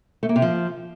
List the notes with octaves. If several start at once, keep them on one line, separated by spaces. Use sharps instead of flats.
A3
A#3
C3
F3